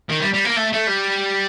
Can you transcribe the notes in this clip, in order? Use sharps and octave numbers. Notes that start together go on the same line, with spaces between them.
D#3
G3
G3
A#3
A3
A3
G3